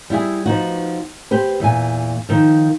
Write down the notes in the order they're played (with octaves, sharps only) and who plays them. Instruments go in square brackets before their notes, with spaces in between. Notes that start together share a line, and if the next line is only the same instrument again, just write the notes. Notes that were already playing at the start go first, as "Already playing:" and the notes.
[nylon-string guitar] G3 E4 F#4 G#4
F3 B3 D#4 F#4
G4 B4 C5
E2 A#2 G#5
D#3 F3